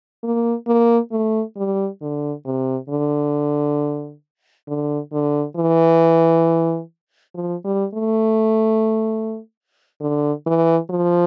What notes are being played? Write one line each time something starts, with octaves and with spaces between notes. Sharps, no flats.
A#3
A#3
A3
G3
D3
C3
D3
D3
D3
E3
F3
G3
A3
D3
E3
F3